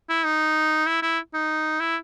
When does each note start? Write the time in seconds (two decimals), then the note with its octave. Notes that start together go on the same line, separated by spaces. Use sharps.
0.09 E4
0.25 D#4
0.87 E4
1.03 E4
1.34 D#4
1.80 E4